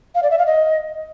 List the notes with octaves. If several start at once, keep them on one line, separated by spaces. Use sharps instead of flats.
F5
D5
E5
F5
D#5